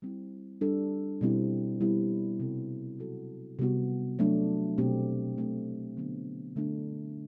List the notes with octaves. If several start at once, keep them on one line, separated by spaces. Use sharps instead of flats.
G3 C4 E4
G3 D4 A4
B2 G3 C4 E4
G3 B3 E4
C3 G3 C4 F#4 A4
F#3 C4 F#4 A4
C3 G3 B3 F#4
F#3 A3 D4
B2 A3 C4 G4
B2 A3 C4
D3 F#3 B3 D4
D3 A3 D4